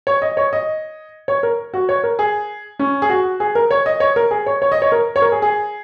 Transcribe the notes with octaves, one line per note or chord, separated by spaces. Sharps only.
C#5
D#5
C#5
D#5
C#5
A#4
F#4
C#5
A#4
G#4
C#4
G#4
F#4
G#4
A#4
C#5
D#5
C#5
A#4
G#4
C#5
C#5
D#5
C#5
A#4
C#5
A#4
G#4
G#4